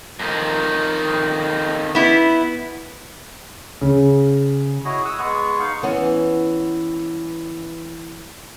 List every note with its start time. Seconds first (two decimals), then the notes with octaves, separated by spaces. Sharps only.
0.19 F2 D#3
1.95 B3 E4
3.81 C#3
4.85 E4 F#4 G#4 C#5 D#5
5.05 F#5 D#6 E6
5.18 G#3 B3 G#4 C#6
5.60 D#4 F5 C#6
5.83 E3 B3 C#4